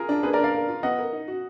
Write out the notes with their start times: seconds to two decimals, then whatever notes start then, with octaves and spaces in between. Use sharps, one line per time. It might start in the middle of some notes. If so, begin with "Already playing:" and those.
Already playing: F4 G#4 A#4
0.09 D4
0.23 A#3 G#4 B4
0.33 A#4 D5
0.38 D4
0.44 D5 F5
0.53 A#4
0.68 F4
0.83 B3 D#5 F#5
0.99 A#4
1.13 D#4
1.28 F#4